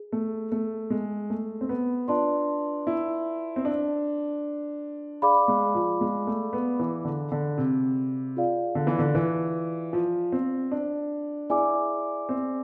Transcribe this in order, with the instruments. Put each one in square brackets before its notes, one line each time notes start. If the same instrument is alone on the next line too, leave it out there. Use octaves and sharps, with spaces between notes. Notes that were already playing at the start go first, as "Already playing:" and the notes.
Already playing: [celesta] G#4
[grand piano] A3
A3
G#3
A3
C4
B3
[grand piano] D4 [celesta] F4 B4 D5 A5 C6
[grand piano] E4
C4
D4
[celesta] G#4 D5 F5 B5 D6
[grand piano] G#3
F3
G#3
A3
B3
E3
D3
D3
C3
[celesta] F4 G#4 D5 F5
[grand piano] D3
E3
D3
E3
F3
C4
D4
[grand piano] E4 [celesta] G#4 D5 G#5 D6
[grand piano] C4